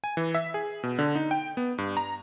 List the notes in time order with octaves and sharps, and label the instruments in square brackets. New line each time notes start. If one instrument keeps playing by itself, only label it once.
[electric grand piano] G#5
E3
E5
G#4
B2
D3
D#4
G5
B3
G2
A#5